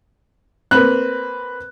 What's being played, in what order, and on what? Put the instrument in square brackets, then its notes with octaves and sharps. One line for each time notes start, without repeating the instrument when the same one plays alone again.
[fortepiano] A#3 C4 [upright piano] B4 F#6